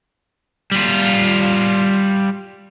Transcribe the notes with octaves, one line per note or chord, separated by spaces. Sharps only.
G3 F4